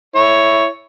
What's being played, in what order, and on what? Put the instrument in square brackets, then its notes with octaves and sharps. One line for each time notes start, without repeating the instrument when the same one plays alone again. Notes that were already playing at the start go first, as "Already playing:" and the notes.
[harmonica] E4 C#5